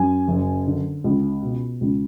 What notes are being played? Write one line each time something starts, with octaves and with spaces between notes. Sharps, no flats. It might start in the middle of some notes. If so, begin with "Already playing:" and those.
Already playing: F#2 G#5
F#1
D3
C#2
B2
C#2